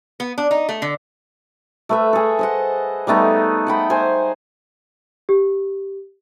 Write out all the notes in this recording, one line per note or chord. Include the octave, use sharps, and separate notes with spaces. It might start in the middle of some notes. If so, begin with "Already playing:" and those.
B3
D4
D#4
A3
D3
A3 B4 E5
G#4 A4
C5 D#5 F#5
G3 A3 B3 D#4
F#5 G5 B5
C5 G#5
G4